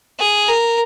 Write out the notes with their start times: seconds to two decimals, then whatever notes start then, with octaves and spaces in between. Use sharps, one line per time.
0.19 G#4
0.48 A#4